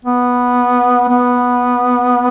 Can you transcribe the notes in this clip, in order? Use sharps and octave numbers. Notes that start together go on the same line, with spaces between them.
B3
B3